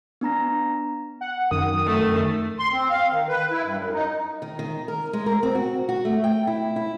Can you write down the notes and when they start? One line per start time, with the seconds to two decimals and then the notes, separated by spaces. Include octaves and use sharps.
0.21 B3 D4 A#5 A#6
1.21 F#5
1.51 F#2 D#3 D#6
1.86 A3
2.59 C6
2.72 C4
2.90 F5
3.12 D#3
3.28 B4
3.51 E4
3.64 G2
3.77 F#2
3.94 D#4
4.42 D#3
4.59 D#3
4.88 A#4
5.13 G#3
5.26 A#4
5.43 C4
5.55 F#4
5.89 F#4
6.05 A3
6.24 G5
6.47 E4
6.76 E4